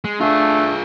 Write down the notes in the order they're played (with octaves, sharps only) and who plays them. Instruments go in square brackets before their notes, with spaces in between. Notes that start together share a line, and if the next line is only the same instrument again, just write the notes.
[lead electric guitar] G#3
[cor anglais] A3 [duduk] D4 [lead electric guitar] F4 G#4